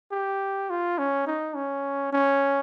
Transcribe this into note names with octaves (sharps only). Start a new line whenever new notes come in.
G4
F4
C#4
D#4
C#4
C#4